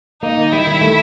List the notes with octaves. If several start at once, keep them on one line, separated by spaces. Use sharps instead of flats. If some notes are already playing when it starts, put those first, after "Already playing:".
A#3 D#4
D#3
G3 E4
D#3
A3